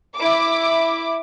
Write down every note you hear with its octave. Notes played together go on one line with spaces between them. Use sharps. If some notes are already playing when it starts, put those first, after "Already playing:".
E4 D6